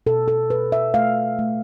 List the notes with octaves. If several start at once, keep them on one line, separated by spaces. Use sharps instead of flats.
B2 A4
A4
B2 B4
E5
A3 F5
A3